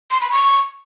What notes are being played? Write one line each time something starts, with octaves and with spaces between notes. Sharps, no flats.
C6
B5
C#6